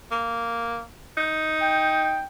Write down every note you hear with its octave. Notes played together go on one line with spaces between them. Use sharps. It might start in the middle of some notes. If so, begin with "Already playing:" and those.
A#3
D#4
G5